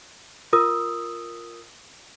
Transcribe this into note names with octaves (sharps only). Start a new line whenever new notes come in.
F4 A#4 D#6 E6